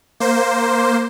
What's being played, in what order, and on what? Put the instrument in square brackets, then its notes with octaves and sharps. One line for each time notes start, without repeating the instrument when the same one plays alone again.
[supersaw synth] A#3 C5